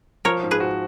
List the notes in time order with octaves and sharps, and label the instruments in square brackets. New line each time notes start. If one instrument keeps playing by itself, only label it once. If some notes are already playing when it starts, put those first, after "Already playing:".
[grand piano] F3 [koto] A#4 C#5
[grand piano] G#2
[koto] G#4 B4
[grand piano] F#4